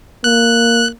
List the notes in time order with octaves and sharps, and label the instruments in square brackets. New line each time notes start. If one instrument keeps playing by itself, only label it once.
[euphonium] A#3 [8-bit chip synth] F#6